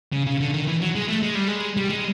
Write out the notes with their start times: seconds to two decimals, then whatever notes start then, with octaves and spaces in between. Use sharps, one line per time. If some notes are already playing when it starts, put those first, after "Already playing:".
0.13 C#3
0.26 C#3
0.41 D3
0.54 D#3
0.68 E3
0.81 F#3
0.95 G#3
1.08 A3
1.23 G#3
1.35 G3
1.48 G#3
1.77 G3
1.90 G#3